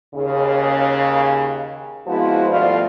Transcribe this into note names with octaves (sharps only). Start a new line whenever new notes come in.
D#2 C#3
F3 G#3 B3 C4 E4 F#4
G2 B2 F3 A3 F4